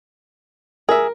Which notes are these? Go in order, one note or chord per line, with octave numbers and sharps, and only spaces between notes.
G#4 A#4 E5